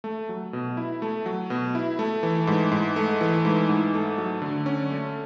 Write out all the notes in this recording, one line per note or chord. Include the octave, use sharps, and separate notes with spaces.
A3
F#3
B2
E4
A3
F#3
B2
E4
A3
E3
G#2
G#2
A3
E3
G#2
G#2
A3
F#3
D3
C#4
A3